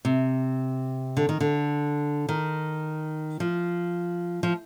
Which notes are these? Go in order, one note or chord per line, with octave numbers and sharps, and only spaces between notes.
C3
D3
D#3
D3
D#3
F3
F3